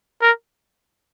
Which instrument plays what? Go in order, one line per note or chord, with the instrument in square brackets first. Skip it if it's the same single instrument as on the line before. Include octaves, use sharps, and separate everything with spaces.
[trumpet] A#4